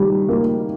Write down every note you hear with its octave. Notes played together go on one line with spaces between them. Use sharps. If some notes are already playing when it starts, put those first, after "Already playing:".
Already playing: D#3 G3
A#3